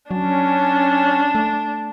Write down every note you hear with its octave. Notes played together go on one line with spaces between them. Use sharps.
F#3 C#4 D4
A3